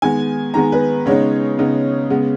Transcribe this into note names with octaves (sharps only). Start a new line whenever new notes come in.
D#3 G#3 B3 G#5
D#3 G#3 B3 A#5
B4
C#3 G#3 B3 D#4 C#5
C#3 G#3 B3 D#4
C#3 G#3 B3